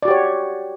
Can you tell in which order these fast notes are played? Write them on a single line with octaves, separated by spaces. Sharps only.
D5 F#4 G4 C#5